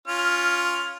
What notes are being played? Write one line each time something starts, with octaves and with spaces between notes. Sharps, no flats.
C#4 F4 F6